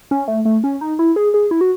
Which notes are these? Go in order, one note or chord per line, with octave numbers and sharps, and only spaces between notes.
C#4
A3
A3
C#4
D#4
E4
G#4
G#4
E4
F#4